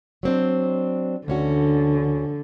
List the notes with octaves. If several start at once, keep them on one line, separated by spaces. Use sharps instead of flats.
F#3 C4 D4
D2 D3 C#4 F#4